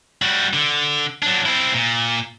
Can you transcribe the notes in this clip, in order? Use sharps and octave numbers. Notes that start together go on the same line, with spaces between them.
G3 F#4
D3
F#3 D4
C4 E4
A#2